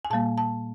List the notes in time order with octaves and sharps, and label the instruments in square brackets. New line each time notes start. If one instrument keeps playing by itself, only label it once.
[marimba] G#5
A#2 G3 A#3 A5
A5